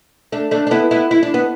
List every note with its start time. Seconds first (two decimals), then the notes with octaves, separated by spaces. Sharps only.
0.32 A3 D4
0.51 A3 D4
0.67 D4
0.71 B3 E4
0.91 B3 E4
1.11 E4
1.23 D4
1.34 B3